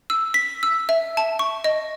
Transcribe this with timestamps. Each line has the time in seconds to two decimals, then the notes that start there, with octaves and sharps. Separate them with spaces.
0.10 E6
0.34 B6
0.63 E6
0.89 E5
1.17 A5
1.39 C#6
1.64 D#5